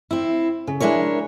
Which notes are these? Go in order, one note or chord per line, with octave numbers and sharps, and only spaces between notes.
C4 E4
C#3
G#3 D4 E4 A#4 C#5